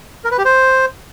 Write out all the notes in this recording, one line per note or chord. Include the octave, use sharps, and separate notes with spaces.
A#4
B4
G4
C5